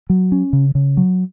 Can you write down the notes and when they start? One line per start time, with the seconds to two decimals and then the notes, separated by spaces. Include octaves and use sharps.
0.10 F#3
0.32 C#4
0.53 C#3
0.75 C#3
0.97 F#3